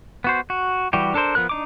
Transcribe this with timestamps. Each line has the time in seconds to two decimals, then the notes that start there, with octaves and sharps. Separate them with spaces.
0.24 B3 F#4 C5
0.50 F#4
0.93 E3 G3 F#4 G4
1.14 D4 A4 A#4 C5
1.35 F3 B3 A#4 F#6
1.49 D4 D#4 D6